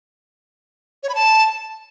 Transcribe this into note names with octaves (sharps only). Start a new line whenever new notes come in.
C#5
B5
A5